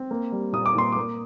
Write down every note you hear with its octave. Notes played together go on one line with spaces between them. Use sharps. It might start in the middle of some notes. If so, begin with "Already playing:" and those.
Already playing: C4
A#3
G3
A#2 D#6
D6
A#2 C6
A#3 D6